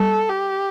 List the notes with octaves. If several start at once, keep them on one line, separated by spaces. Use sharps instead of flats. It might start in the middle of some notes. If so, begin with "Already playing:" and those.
Already playing: G3 A4
G4